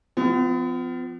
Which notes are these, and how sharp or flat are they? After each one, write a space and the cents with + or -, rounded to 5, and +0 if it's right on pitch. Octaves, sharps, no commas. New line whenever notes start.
F3 +0 B3 +45